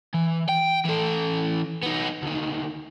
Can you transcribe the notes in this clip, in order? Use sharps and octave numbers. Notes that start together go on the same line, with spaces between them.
E3
G5
E3 A4
B3 D#4
D2 D#3